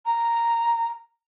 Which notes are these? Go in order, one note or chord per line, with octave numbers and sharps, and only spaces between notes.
A#5